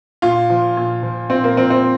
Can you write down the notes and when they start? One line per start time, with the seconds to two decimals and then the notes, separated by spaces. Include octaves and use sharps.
0.22 A#2 F4
0.50 F3
0.77 A#2
1.03 F3
1.30 A#2 C4
1.44 A#3
1.57 F3 C4
1.70 C4